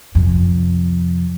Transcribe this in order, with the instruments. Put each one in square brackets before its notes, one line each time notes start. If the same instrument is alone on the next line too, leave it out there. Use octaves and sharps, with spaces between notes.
[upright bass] F2 C3